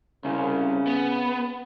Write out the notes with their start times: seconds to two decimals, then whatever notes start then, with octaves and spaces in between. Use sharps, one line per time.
0.25 C2 C#3 C#4
0.87 B3